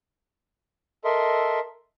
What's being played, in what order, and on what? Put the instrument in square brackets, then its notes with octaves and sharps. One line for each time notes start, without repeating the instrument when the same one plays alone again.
[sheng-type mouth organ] A4 A#4 D#5 E5 C6